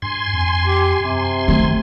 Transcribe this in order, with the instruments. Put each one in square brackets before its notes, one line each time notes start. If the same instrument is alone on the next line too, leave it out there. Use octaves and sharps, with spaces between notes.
[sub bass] G2 [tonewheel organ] G#5 C6
[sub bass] F2
[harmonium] G4
[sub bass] F#2 [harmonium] C3
[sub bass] D#3 [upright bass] A3